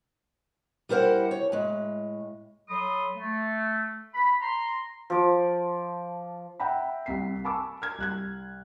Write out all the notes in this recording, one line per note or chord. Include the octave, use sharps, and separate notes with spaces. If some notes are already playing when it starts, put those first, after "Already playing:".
G3 E4 A#4 C5 F#5
C#5
A2 G#3
F#3 A4 B5 C6 D#6
A3
B5
A#5 C6
F3 D6
E5 F#5 G5 A#5 B5
C2 C3 B6 C7
G#5 A5 B5 C#6 D6 E6
F6 G#6
C2 F#6 G#6